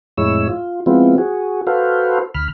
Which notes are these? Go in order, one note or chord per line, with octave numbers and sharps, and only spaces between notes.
F2 A2 G#3 E4 C#5 E6
F4
F3 G#3 B3 C4 E4 F4
F#4 G#4
F#4 A4 B4 C5 F5
D2 B5 F6